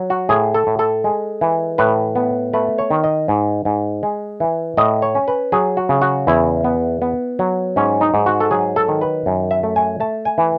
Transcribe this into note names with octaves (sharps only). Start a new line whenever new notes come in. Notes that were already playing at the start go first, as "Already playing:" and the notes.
Already playing: F#3
F#4
A2 G#4
A4
A2
A4
G#3
E3
A2 B4
B3
A3 B4
C#5
D#3
D#5
G#2
G#2
G#3
E3
A2 D#5
C#5
C#4
B4
F#3 G#4
F#4
C#3
F#4
E2 E4
B3
B3
F#3
G#2 C#4
D#4
G#2
F#4
A4
F#3 G#4
A4
D#3
B4
F#2
E5
A3
G#5
A3 A5
G#5
E3